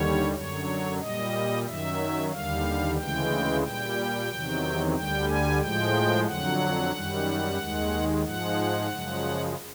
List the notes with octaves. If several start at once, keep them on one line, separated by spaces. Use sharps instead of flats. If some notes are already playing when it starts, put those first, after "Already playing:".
Already playing: D#2 D3 G3 C#5
F#2 D3 F#3 C#5
A#2 G3 D#5
F#2 D#3 F#3 E5
D#2 D3 G3 F5
D2 C#3 E3 G#3 G5
A#2 G3 G5
E2 C3 D#3 F#3
D2 D3 G3 G5
G#5
A2 F3 G#3 G5
F2 D3 F#3 F#5
F#2 D#3 G3
D#2 D#3 G#3
G#2 F3 G#3 F#5
F#2 C#3 F3 G#3